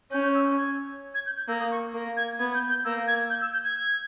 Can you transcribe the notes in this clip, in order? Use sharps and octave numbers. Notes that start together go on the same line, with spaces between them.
C#4 G6
G6
E6
G#6
G#6
G6
G6
A#3 E6
D#6
C#6
A#3
G#6
B3 G#6
G6
G6
A#3 E6
G#6
G6
E6
G6
G#6